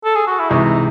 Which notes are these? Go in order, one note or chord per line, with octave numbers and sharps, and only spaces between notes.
A4
G#4
F#4
E4
C3 E3 G#3 D#4